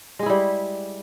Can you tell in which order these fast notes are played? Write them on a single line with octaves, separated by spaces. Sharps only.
G#3 G#4 E4 G3